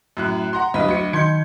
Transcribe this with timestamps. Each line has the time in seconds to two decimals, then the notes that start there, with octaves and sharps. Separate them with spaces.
0.17 F#2 A2 F#6
0.53 F#5 A#5 C6
0.74 D2 G2 E3 F#3 D#5 B5
0.89 D2 C#7
1.13 D#3 C6 G6 G#6 C#7